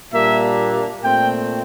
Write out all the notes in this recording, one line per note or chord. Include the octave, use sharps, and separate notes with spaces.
A#2 G3 A#3 D4 E5
A#2 A3 C4 G5